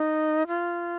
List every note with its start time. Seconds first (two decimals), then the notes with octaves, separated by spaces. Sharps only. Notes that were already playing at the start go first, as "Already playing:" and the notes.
Already playing: D#4
0.47 F4